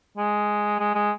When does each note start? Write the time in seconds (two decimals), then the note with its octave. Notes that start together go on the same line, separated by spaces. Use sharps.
0.17 G#3
0.79 G#3
0.95 G#3